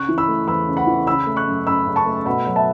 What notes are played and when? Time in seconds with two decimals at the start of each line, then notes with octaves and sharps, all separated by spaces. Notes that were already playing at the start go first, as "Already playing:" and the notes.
Already playing: C#3 C#6 F#6
0.08 E3
0.18 B5 E6
0.28 A3
0.48 E2 B5 E6
0.68 C#3
0.77 F#5 B5
0.87 E3
1.07 C#3 B5 E6
1.26 A3
1.37 C#6 F#6
1.47 F#2
1.66 F#2 B5 E6
1.87 C#3
1.96 A5 C#6
2.06 A3
2.26 B2 F#5 B5
2.46 F#3
2.56 E5 A5